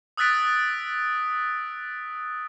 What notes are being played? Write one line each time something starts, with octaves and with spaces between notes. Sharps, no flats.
D#6 E6 F#6 A6 B6 D7